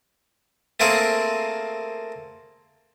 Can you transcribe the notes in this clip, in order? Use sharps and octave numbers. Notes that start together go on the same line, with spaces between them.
A3 A#3 C4 G#4 A#4